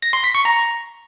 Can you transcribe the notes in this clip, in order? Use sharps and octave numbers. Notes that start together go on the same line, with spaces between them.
A#6
C6
B6
C#6
A#5